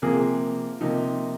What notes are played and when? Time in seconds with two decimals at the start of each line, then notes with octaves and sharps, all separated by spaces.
0.02 C3 F3 A#3 G#4
0.81 C3 F3 A#3 D#4